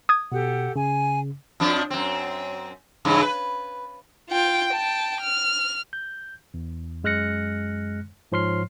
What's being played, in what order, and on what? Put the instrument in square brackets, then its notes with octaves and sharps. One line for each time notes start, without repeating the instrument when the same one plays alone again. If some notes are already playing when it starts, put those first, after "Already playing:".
[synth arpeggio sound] D#6 G#6
[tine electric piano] B2 [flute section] G4 A4 F#5
[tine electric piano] C#3 [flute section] G#5
[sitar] F2 F3 D4
F#2 C4
G2 C#3 E3
B4
[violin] F4 G5
G5 A5
F6
[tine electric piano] G6
E2
F#2 G#3 F6 F#6 A#6 C#7
G#2 F3 C#5 C6 F6 C7